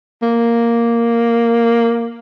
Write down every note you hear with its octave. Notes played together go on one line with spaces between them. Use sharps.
A#3